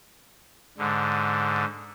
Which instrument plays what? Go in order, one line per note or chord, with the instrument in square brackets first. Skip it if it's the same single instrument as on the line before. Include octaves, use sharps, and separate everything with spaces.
[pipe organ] G#2 D3